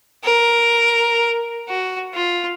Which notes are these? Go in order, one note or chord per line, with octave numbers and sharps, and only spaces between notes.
A#4
F#4
F4